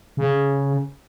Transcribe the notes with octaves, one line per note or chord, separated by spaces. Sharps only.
C#3